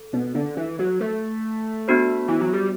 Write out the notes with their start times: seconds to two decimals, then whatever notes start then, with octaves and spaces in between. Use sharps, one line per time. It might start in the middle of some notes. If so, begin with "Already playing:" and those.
Already playing: A4
0.13 B2
0.35 D3
0.57 E3
0.79 F#3
1.00 A3
1.88 B3 D4 F#4 C5
2.28 E3
2.41 F#3
2.53 G3